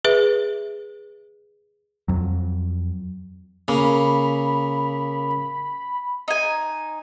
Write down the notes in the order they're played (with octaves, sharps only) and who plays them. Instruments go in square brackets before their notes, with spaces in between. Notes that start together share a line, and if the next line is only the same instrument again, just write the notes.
[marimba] G#4 B4 E5
[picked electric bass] F2 F#3
[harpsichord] C#3 A#3 [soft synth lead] B5
[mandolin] D#4 G#5